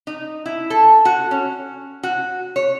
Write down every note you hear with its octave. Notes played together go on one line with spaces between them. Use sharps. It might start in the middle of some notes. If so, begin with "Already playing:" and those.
D#4
E4
A4
F#4
C#4
F#4
C#5